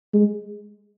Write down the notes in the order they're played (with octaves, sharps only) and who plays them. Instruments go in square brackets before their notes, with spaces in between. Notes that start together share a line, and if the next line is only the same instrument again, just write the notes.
[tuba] G#3